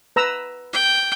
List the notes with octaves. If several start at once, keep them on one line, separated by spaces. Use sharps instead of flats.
B4 A#5 E6
G5